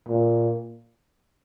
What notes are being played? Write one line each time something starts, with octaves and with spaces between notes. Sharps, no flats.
A#2